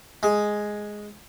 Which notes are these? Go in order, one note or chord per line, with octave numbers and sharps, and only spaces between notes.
G#3